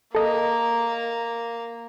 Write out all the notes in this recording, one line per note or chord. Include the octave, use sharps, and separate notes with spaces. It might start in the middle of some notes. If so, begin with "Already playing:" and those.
A#3 A4 D#5